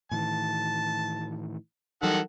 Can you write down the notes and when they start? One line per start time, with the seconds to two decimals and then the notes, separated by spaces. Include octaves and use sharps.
0.11 A2 D#3 E3 A5
2.03 D#3 E3 F#3 G3 A4 F#5